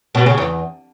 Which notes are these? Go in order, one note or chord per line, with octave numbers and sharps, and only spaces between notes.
B2
C#3
E2